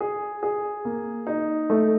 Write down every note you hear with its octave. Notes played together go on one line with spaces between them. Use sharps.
G#4
G#4
A#3
D#4
A3